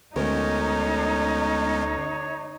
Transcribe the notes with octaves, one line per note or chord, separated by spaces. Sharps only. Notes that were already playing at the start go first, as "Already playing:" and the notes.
D2 G#3 B3 C#4 D#4 A#4 C#5